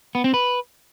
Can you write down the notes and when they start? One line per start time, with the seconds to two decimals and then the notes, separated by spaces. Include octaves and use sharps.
0.15 B3
0.24 C4
0.34 B4